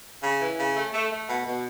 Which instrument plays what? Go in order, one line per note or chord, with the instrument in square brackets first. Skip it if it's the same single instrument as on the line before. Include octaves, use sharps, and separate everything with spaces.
[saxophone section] C#3
E3
C#3
A3
A3
A3
B2
B2